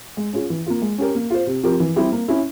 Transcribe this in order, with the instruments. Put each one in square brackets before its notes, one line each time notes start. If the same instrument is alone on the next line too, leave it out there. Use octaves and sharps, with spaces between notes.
[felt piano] G#3
C#4 F4 G#4
E3
A#3 F4
G#3
C#4 G4 A#4
A#3
F4 C5
C3
F3 C4 G4 A#4
E3
G3 C4 E4 G4
A#3
C#4 E4